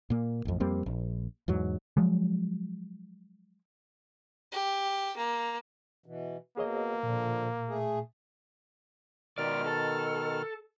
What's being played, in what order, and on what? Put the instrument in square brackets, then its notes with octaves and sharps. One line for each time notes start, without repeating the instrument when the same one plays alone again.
[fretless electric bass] A#2 A#3
A1 F2
F2 G3 A#3 C4
A#1
E2 G#2 F#3
[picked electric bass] F3 F#3 G#3
[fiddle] G4
A#3
[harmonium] B2 E3
[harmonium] B2 [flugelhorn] A#3 [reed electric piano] G#4 C#5 D#5
[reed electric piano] A#2 [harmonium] D3 F3
[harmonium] A3 G#4
[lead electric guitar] C#2 D5 [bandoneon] B2 D#3 F6
[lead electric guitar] A4